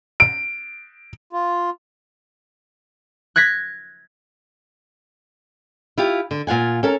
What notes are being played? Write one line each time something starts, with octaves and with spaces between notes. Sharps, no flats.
D7
F4
F#6 G#6 A#6 B6
E4 F4 G4
D3
A#2 F4 F#5 G#5
C#4 A4 A#4